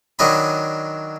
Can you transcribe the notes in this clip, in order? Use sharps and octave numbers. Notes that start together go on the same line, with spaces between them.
D#3 F#3 D4 D#5 G#5 B5